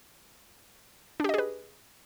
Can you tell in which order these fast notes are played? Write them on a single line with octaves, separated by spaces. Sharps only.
D4 G4 D#5 G#4 B4